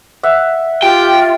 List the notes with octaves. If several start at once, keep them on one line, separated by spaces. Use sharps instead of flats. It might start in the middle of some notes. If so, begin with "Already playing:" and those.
E5 F#5
F4 G4 G5